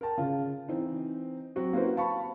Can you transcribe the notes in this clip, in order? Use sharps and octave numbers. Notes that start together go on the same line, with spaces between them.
A#4 G5 A5
C#3 F4
E3 C4 D#4
F#3 C4 F#4
A#3 C#4 E4 F#4 B4 C5
F5 A5 B5 C#6